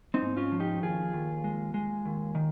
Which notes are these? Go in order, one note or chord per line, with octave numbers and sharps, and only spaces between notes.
C4 D#4
G#2
C#4 F4
F3
D#4 G4
D#2 F4 G#4
D#2
G#3
G#3
D#2
D#3